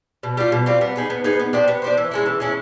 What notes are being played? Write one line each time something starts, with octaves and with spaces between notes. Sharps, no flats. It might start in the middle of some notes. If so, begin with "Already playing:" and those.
B2
G3 C4 F4
B2
G3 C4 F4
B3
D#4 G#4 B4
B3
D#4 G#4 B4
B3
D4 G4 C5
B3
D4 G4 C5
E3
G#3 C#4 E4
E3
G#3 C#4 E4